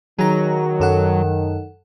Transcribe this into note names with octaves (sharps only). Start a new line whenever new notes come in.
D#3 F#3 G#4 A#5
F#2 A4 F#5